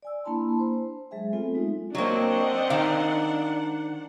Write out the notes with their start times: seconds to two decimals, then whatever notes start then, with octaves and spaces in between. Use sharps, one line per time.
0.03 D5 G#5 E6
0.24 A#3 D4 E4 A5 B5 C6
0.60 C5
1.11 F#3 G#3 G#4 E5 G#5
1.33 A3 B3 C4 F4 A4
1.54 G#3 D#4
1.95 F#3 A#3 C4 D4 D#5 F#5
2.70 D#3 F5